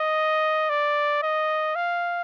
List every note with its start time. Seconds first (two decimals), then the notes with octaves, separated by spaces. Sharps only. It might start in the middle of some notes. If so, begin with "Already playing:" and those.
Already playing: D#5
0.69 D5
1.23 D#5
1.76 F5